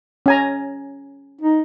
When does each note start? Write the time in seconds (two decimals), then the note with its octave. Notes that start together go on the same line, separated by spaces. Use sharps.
0.26 C#4 G#5 A#5
1.41 D#4